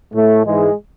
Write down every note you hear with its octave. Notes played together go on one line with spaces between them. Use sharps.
A2 A3
G#2 E3 G#3